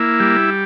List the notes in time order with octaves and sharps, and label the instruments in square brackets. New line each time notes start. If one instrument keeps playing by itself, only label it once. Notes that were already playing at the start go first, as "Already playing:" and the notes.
Already playing: [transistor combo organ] A#3 E4
G3